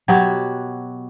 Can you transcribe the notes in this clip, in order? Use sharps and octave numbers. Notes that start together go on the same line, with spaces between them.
B2 F#3 F#4 G4